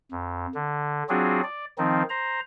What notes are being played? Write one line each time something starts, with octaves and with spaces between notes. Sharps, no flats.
F2
D3
F#3 C4 D4 F4 F#4 G#4
D5
D#3 F3 C4 D#4
C5 A#5